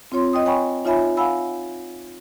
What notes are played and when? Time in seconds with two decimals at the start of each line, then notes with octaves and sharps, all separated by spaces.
0.12 C4 F4 C#5 C6
0.33 D#5 G5 D#6
0.46 C#5 G5 G#5 B5 C#6
0.85 D#4 F4 C#5 E5 G#5 B5
1.17 F5 F#5 G#5 B5 E6